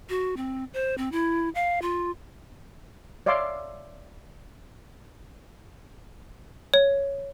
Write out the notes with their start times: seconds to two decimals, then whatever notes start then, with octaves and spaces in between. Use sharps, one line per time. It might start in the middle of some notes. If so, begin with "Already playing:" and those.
0.10 F#4
0.37 C4
0.74 C5
0.98 C4
1.12 E4
1.55 F5
1.82 F4
3.26 C#5 D5 E5 F5 C6 D6
6.74 C#5